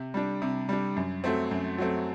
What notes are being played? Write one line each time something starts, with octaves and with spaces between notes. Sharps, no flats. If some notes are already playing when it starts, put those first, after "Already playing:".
Already playing: C3
G3 D4
C3
G3 D4
F#2
F#3 A3 C4
F#2
F#3 A3 C4